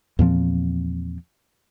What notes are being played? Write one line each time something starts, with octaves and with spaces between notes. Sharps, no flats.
E2 A#2 F3 C4